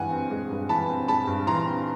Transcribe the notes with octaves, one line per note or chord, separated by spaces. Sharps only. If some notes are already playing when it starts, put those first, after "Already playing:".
Already playing: G2 E3 G#3 C4 F#5 G#5
C4
G#3
G2
E3 A5 B5
C4
G#3 A5 B5
G2
E3 A#5 C6
C4